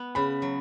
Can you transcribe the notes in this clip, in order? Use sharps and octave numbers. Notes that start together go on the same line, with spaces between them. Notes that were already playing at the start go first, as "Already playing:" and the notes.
Already playing: B3
C#3 B5
F#3